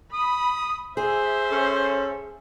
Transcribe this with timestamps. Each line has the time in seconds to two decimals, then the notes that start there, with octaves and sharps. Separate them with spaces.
0.13 B5 D#6
0.97 G#4 C5 E5
1.50 C#4 A4